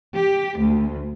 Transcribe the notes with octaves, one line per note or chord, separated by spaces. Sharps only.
G4
D2